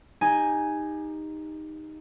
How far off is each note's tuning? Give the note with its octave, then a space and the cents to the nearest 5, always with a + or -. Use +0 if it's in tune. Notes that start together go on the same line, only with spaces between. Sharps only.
D#4 +0 G4 +25 G#5 +0